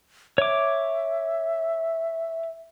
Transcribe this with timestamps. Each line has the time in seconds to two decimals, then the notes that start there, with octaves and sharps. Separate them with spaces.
0.38 C#5 E5 D6